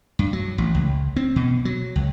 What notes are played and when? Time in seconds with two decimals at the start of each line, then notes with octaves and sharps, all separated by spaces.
0.19 G2
0.33 F#3
0.58 A1
0.75 C#2
1.16 C4
1.36 B2
1.65 F#3
1.96 C#2